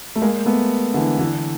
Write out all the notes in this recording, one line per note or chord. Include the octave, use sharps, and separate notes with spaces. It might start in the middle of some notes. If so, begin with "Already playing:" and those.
A3
G#3 A#3
A3 B3
D3 E3
D3 E3